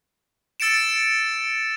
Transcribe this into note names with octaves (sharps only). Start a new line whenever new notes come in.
E6 A6 C#7 D7 E7